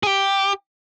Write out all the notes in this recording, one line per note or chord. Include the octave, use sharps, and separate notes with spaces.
G#4
G4